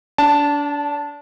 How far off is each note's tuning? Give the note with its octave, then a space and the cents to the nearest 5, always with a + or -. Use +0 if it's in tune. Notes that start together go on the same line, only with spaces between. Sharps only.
D4 -30 A5 +0